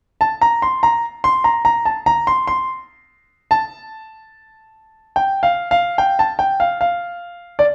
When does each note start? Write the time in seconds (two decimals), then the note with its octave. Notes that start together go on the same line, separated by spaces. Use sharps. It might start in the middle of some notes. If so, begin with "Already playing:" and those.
0.21 A5
0.42 A#5
0.62 C6
0.83 A#5
1.24 C6
1.44 A#5
1.65 A#5
1.85 A5
2.06 A#5
2.27 C6
2.48 C6
3.51 A5
5.16 G5
5.43 F5
5.71 F5
5.98 G5
6.19 A5
6.39 G5
6.60 F5
6.81 F5
7.59 D5